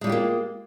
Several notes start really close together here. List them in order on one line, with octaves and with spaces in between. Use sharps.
G#3 G3 F4 G4 A#3